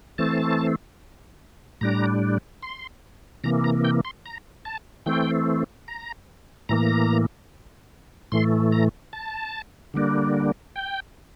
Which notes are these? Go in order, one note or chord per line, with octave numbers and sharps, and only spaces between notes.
E3 A3 C4 A5
A2 G3 D4 A#5
C6
C3 E3 A#3 A#5
A#5
G5
C6
A#5
A5
E3 A3 C4 G5
A#5
A2 E3 A#3 A#5
A2 E3 A3 C6
A#5
A5
D3 G3 A#3 D4
G5